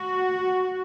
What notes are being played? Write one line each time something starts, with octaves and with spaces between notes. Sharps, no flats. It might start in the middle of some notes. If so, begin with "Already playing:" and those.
Already playing: F#4